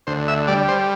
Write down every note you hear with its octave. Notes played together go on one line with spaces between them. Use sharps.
D2 C5
E5
G3 D5
C5